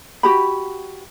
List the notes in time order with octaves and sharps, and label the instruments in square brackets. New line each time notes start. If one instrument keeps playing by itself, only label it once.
[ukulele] F#4 G4 B5